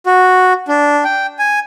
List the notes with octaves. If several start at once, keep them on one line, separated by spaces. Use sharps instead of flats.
F#4
D4
G5
G#5